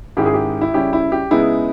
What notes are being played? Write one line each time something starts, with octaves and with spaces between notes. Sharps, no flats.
G#2 D#3 G#3 C#4 E4 G4
G#4
G4
E4
C#3 G3 C#4 E4 G4
E4
G4
C#3 G#3 B3 D#4 E4